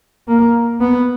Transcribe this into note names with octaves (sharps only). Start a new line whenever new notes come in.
A#3
B3